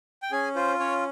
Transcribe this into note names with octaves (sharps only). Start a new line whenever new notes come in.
G5
C#4 G#4 G#5
F4 C5
C#4 C#5